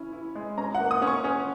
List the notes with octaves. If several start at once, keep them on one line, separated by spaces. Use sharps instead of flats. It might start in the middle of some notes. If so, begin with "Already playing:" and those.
Already playing: C#4 E4
E4
G#3
C#4 A#5
F#5
A#3
D#6
C#4
C#6
C#4